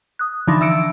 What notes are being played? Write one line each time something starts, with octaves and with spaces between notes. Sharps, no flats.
D#6 F#6
D3 E3 F3 D4 D#4
E5 E6 C#7 D7